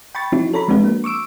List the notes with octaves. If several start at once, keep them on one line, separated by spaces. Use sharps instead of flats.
G5 B5 C#6 A6
F3 C4 C#4 D#4 E4 F#4
A4 C#5 A#5 B5
F3 G#3 C4 D4 F#4 B4
A#3
C#6 D6 E6 D7